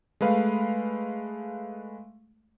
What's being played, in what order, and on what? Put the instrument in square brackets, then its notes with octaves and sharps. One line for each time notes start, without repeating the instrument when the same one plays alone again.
[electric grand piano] G#3 A3 B4 F5